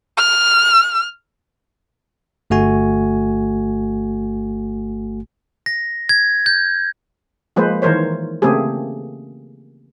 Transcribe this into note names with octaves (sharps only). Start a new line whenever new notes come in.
F6
G1 A3 F#4 G#5
A#6
G#6
G6
F3 G#3 A#3 B4 C5
D#3 E3 A#4 C5 C#5
C#3 A3 A#3 C4 G4 G#4